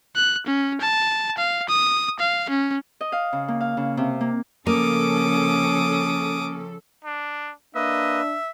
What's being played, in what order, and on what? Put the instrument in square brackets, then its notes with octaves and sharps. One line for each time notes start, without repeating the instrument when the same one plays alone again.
[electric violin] F#6
C#4
A5
F5
D#6
F5
C#4
[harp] D#5
F5
C#3
A#3
F5
C#3
C3
A#3
[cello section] C#3 F3 A4 [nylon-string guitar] A#3 [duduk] C#4 [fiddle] D6 D#6
[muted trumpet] D4
[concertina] A#3 B4 [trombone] D4 [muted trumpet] D#5 [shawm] E5